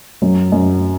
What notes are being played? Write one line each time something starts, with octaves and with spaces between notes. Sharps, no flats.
F#2 F#3
F#2 F#3